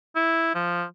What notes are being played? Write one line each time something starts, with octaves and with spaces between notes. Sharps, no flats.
E4
F3